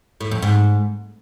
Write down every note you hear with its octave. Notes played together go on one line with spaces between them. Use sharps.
A2
F2
G#2